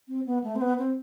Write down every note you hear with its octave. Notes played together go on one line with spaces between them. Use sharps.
C4
B3
A3
C4
B3
C4